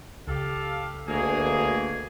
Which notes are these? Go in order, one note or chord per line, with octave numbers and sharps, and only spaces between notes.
C#2 G4 A4 F5
D2 B2 A#3 G#4